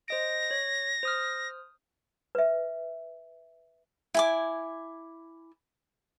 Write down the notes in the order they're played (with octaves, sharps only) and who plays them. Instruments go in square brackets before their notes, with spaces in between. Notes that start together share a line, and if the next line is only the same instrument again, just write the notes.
[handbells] C5 D#5 D7 [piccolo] A#6
[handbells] C#5
C5 D#6 F6
[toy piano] B4 E5
[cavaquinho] E4 G#5 D6